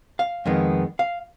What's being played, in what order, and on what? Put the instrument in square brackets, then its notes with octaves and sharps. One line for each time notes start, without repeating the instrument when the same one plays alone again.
[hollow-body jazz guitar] F5
F2 D#3 G#3 B3
F5